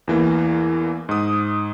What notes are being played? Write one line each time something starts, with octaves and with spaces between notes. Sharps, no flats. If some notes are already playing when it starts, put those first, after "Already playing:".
E2 E3 A#3
G#2 D#6